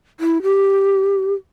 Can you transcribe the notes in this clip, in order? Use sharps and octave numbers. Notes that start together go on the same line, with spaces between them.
E4
G4